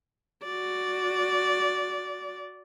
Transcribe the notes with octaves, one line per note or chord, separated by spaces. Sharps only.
F#4 D5